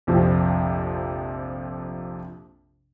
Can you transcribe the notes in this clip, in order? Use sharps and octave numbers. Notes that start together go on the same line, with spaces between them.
A#1 F2 C3 F3